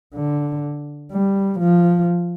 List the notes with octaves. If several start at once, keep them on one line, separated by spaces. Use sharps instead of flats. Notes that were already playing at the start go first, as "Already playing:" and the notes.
D3
G3
F3